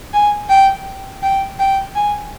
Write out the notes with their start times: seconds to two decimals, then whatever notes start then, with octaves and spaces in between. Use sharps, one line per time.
0.14 G#5
0.49 G5
1.23 G5
1.59 G5
1.95 G#5